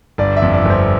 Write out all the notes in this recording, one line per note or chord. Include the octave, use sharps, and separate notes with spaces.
G1 D5
E5
F2
D5
G1 C5